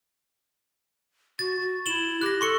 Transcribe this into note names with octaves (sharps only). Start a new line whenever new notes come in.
F#4 A6
F#4
E4 E7 F#7 G7
G4 F#6 A#6
A4 C6 C#6 C#7